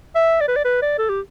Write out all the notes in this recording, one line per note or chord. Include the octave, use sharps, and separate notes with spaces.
E5
D5
B4
D5
B4
D5
A4
G4